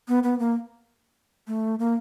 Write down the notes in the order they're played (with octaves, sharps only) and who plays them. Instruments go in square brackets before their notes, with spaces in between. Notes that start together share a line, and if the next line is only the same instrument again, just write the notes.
[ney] B3
B3
A#3
A3
A#3